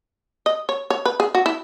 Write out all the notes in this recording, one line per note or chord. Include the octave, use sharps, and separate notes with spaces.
D#5
C#5
C#5
B4
G#4
F#4
E4